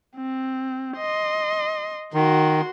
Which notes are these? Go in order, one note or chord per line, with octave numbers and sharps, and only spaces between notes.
C4
D#5 C6
D#3 F#4 C6